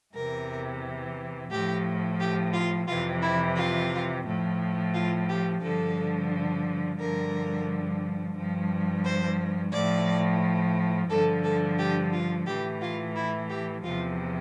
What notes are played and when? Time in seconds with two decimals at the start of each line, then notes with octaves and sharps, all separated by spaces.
0.14 E2 C3 E3 A#4
1.51 A2 F3 G4
2.20 G4
2.54 F4
2.88 F2 C3 E3 F4
3.22 E4
3.57 F4
4.25 A2 F3
4.94 F4
5.29 G4
5.62 G2 D3 F3 A4
6.99 G2 D3 F3 A#4
8.36 G2 F3
9.05 C5
9.73 A2 F3 D5
11.10 G2 D3 F3 A4
11.44 A4
11.79 G4
12.13 F4
12.47 A2 E3 G4
12.81 F4
13.16 E4
13.50 G4
13.84 E2 C3 F3 F4